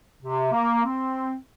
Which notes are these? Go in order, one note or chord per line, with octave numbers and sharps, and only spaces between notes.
C3
A#3
C4